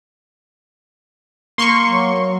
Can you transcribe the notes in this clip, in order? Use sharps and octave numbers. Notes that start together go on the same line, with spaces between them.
A#3 C6 C#6
F#3